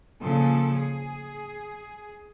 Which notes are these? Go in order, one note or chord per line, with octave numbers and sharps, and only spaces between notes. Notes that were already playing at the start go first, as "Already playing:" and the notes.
A#2 C#3 F3 A4
G#4